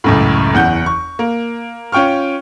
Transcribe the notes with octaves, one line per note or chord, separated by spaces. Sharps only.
C#2 F#2 A2
F#1 E2 F#5 G6
C#6
A#3
C#4 F4 G5 C#6 F6